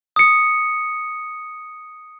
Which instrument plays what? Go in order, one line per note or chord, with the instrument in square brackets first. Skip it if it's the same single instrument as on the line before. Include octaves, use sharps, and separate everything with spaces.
[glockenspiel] D#6 C#7